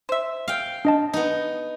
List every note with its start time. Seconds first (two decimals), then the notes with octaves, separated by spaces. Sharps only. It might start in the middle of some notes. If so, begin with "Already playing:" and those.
0.09 C5 E5
0.48 F5 G5
0.85 D4 D#5 A5
1.13 B3 D#4